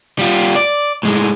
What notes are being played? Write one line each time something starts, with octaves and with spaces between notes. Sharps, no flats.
G3 F4
D5
A2 G#3